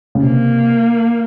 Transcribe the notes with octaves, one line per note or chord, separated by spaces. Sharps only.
C#3
C3 A#3